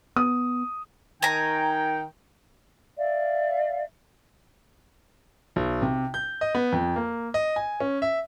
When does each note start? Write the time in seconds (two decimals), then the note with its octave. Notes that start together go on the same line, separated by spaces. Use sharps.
0.16 B3 D#6
1.22 D#3 G5 G#5 A#5
2.98 D5 E5 F5
5.56 B1
5.82 C3
6.14 G6
6.41 D#5
6.55 B3
6.72 F2
6.96 A#3
7.34 D#5
7.56 G#5
7.80 C#4
8.02 E5